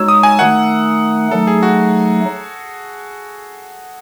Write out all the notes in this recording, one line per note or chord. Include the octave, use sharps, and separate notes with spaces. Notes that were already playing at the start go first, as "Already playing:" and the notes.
Already playing: G#3 D#4 F#4 C#5 E6
D#6
G#5
D#3 A3 D#4 F#5
F#3 A3 D#4 A4
G#4
F#4